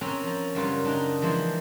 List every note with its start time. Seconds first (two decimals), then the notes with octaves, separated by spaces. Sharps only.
0.01 C4 C#4 A#4 G5 A#5 B5
0.24 F3 A#5
0.55 F#2 C#3 G3 F4 A#4 B4
0.84 C#3 D4 D#4 A#4
1.22 E3 F3 G#3 C5